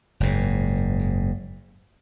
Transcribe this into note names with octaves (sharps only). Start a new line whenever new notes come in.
F#1 G#2